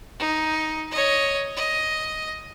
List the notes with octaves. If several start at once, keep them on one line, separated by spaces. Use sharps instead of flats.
D#4
C#5 D#5
D#5